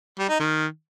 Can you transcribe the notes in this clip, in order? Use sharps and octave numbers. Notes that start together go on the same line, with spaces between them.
G3
D#4
D#3